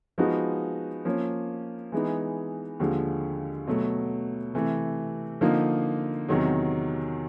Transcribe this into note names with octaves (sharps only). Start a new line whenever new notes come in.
F3 G#3 B3 D#4 F#4
F3 A#3 C#4
E3 G#3 B3 D#4
D#2 D3 F3 G#3
B2 F#3 A3
C3 E3 A3
D3 F3 A#3 D#4
E2 C3 D#3 F#3